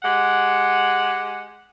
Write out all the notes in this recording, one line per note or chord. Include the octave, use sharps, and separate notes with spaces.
G#3 G4 F#5